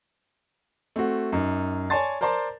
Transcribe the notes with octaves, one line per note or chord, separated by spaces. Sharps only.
A3 C4 F#4
F#2 D#4
C#5 D5 G#5 A5 C6 A6
A#4 C5 D5 A5 A#5 C6